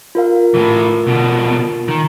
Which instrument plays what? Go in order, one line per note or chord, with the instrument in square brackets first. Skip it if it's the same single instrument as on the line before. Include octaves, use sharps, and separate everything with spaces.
[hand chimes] F4 A#4 F5
[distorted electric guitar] A2 E3
B2 D3
D#3